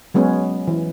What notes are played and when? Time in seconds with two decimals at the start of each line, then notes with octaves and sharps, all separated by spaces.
0.14 F#3 G#3 B3 C#4
0.67 E3